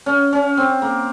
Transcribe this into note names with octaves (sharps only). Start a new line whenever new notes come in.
C#4
C#4
C4
A#3